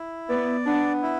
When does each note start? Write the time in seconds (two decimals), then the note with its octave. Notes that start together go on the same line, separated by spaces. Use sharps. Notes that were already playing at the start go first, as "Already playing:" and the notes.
Already playing: E4
0.29 B3 D5
0.66 B3 D4
1.03 E4